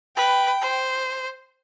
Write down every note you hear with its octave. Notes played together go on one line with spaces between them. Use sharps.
B4 G5
C5